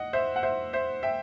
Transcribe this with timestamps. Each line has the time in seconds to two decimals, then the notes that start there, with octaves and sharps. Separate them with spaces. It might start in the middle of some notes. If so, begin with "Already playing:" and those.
Already playing: D#5 F#5
0.13 C5 E5
0.36 F#5
0.43 C5 E5
0.73 C5 E5
1.03 E5 G5